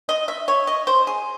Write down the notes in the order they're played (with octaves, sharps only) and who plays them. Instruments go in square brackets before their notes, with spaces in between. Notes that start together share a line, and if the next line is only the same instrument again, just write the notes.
[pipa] D#5
E5
C#5
D#5
C5
G#4